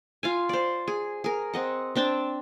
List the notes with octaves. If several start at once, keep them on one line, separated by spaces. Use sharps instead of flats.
F4 F5 G#5
C5 D5
G#4
G#4 A#4
C4 D#5 F#5
C4 D4 G5 A5